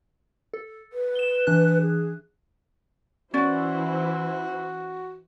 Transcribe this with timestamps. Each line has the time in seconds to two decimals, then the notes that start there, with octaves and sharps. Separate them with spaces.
0.54 A4
0.93 B4
1.15 E7 G7
1.47 E3 D4 F#6
1.82 G#4
3.34 E3 C#4 E4 F#4 C5 D5